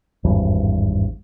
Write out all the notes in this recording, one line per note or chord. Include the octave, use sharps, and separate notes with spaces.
G#1 E2 G2